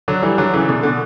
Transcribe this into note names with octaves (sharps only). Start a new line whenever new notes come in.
D3 F#3
E3 G3
D3 F#3
C#3 E3
B2 D3
B2 D3